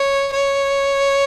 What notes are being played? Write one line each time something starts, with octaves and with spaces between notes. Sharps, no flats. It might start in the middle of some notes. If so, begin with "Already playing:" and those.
Already playing: C#5
C#5